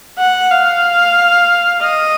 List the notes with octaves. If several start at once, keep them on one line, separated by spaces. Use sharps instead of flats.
F#5
F5
D#5